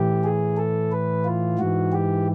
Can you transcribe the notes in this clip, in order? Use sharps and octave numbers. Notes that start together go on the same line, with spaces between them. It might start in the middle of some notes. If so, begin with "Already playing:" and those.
Already playing: A2 E3 G4
G#4
A4
B4
F4
G#2 E3 F#4
G4